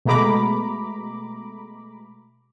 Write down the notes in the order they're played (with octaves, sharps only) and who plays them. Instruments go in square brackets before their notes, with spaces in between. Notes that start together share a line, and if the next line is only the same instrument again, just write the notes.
[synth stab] B2 G#3 A3 A#5 B5 D6